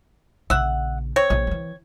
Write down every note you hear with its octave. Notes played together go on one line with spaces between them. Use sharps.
A#1 C#3 E5 F#5
C4 C#5
A#1
D#3 E3